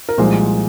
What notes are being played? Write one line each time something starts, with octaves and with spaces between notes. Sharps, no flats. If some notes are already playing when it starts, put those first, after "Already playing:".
A#4
C2 A#2 F3 G#3 C5